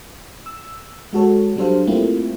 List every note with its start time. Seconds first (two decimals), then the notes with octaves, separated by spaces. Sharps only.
0.46 E6
1.13 G#3 F#4 A4 C#5
1.56 F#3 G3 D4 A4 C5 F5
1.87 G3 A3 A#3 C4 E4 F4